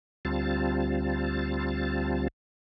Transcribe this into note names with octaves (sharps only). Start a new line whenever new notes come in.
D2 G3 C4 F4 A5